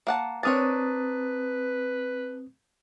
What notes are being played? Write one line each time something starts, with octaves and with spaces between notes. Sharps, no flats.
A#3 F#5 A5
C4 D4 A#4 B4 C#5 D#6 A6